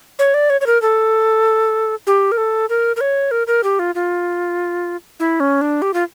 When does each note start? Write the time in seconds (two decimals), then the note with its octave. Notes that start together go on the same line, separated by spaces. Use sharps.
0.19 C#5
0.34 D5
0.50 C#5
0.61 C#5
0.66 A#4
0.82 A4
2.07 G4
2.32 A#4
2.38 A4
2.69 A#4
2.96 A#4
3.01 C#5
3.31 A#4
3.47 A#4
3.64 G4
3.79 F4
3.95 F4
5.20 E4
5.40 C#4
5.61 D4
5.82 G4
5.94 F4